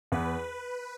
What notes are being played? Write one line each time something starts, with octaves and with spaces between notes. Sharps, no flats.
E2 B4